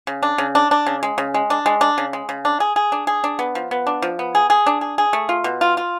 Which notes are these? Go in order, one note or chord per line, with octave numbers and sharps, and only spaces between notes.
C#3
D4
C#3
D4
D4
C#3
G#3
C#3
G#3
D4
G#3
D4
C#3
G#3
C#3
D4
G#4
G#4
D4
G#4
D4
B3
F3
B3
D4
F3
B3
G#4
G#4
D4
G#4
G#4
A3
F4
B2
F4
F4